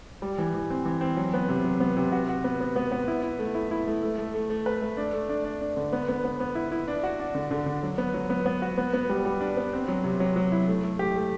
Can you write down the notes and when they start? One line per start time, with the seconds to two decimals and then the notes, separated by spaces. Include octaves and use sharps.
0.22 G3
0.38 E3
0.54 E3
0.70 C4
0.85 E3
1.01 C4
1.17 F#3
1.33 B3
1.49 C3
1.64 F#3
1.80 B3
1.97 C3
2.12 F#4
2.29 F#4
2.44 B3
2.60 B3
2.76 B3
2.92 B3
3.08 E4
3.23 E4
3.39 A3
3.55 E4
3.71 E4
3.87 A3
4.03 A3
4.18 A3
4.34 A3
4.50 A3
4.66 B4
4.82 A3
4.97 D4
5.13 A3
5.29 D4
5.45 D4
5.61 D4
5.77 D3
5.93 B3
6.08 B3
6.24 B3
6.40 B3
6.55 E4
6.72 E4
6.88 D4
7.03 F#4
7.20 D4
7.35 D3
7.51 D3
7.66 D3
7.83 F#3
7.98 B3
8.14 F#3
8.30 B3
8.46 B3
8.62 F#4
8.78 B3
8.93 B3
9.09 G3
9.25 G3
9.41 D4
9.57 B3
9.73 C4
9.88 F#3
10.04 C3
10.20 F#3
10.36 F#3
10.52 E4
10.68 A3
10.84 A3
10.99 G4
11.16 A3